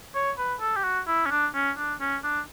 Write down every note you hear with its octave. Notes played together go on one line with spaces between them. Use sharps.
C#5
B4
A4
G4
F#4
E4
C#4
D4
C#4
D4
C#4
D4